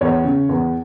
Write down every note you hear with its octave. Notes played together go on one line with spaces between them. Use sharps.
E2 C#5
C#3
E2